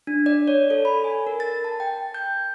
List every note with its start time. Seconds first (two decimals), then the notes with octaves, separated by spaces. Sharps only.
0.07 D4
0.26 D5
0.48 C#5
0.70 A4
0.85 B5
1.04 G#5
1.27 A#4
1.40 A6
1.64 A5
1.80 G5
2.14 G6